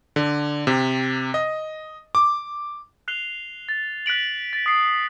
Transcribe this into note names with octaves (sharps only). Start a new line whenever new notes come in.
D3
C3
D#5
D6
F#6 C7 F7 G7
A6
F#6 B6 D7 F#7
A6 B6
D#6 C7